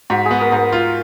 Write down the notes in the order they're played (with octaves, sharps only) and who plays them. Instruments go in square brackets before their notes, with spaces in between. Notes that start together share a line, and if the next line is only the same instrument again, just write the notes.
[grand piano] G#2 [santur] F#4
[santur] G#4
[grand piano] B3
[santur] A#4
[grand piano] G#2 [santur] A#4
[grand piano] F4